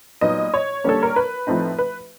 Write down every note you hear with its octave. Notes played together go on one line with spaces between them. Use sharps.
A#2 F#3 B3 D#4 D#5
C#5
D3 G3 A#3 C#4 A4
A#4
B4
A2 F3 A3 C4 D#4
B4